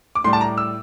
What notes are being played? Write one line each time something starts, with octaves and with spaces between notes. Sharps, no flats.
D6
A2 G3 C6
A5
A#5
E6